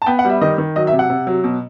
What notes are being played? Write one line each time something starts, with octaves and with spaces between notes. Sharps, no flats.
A5
B3 G5
F#5
G3 E5
D#3 D#5
D#3
F#3 D#5
E5
C3
F#5
C3
F#3
B2